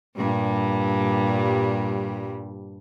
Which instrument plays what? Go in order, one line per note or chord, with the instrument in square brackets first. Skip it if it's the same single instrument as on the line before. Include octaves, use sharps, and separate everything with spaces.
[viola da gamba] G2 A#2 G3